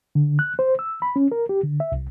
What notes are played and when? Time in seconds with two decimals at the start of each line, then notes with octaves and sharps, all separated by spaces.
0.15 D3
0.39 F#6
0.59 C5
0.79 E6
1.02 B5
1.16 C#4
1.32 A#4
1.49 G4
1.63 D3
1.80 E5
1.92 C2